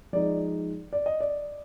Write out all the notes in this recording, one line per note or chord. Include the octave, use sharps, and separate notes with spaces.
F3 G#3 D#4 D5
D5
D#5
D5